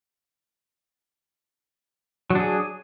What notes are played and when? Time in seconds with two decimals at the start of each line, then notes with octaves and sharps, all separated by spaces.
2.30 F#3
2.35 D4
2.40 G#4